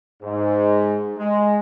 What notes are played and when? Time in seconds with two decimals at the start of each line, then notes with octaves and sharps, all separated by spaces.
0.23 G#2
1.17 G#3